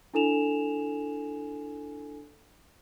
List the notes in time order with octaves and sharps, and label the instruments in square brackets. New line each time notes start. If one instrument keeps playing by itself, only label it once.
[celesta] D4 E4 A4 G#5 E7 F7